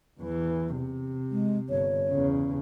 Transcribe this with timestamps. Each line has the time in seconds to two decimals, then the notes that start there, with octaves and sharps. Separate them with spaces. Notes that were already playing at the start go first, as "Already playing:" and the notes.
0.20 E2 E3
0.75 C3
1.32 G#3
1.70 G1 C#5
2.10 E2 C#3